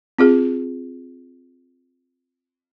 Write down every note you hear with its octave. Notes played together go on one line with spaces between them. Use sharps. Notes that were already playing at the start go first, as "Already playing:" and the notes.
C4 F4 G#4